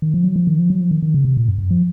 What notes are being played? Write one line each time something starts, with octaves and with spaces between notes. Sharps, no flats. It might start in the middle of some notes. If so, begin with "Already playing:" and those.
D#3
F3
F#3
F3
D#3
F3
F#3
F3
D#3
D#3
C#3
C3
A#2
F#2
F#2
F3